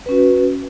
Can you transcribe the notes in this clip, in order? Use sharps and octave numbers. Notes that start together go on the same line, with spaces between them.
C#4 F#4 B4